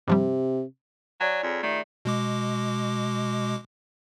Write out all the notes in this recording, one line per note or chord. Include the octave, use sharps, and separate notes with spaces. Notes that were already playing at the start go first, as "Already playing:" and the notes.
G2 C3 F3 G3
F#3 C#5 D5 G#5
F2 F4 G#4
D#3 A3 D5 E5
B2 G#3 D6